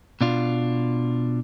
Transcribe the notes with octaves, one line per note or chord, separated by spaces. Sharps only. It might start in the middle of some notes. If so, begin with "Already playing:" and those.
B2 D4 F4